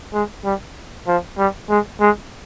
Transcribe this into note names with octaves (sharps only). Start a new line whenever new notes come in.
G#3
G3
F3
G3
G#3
G#3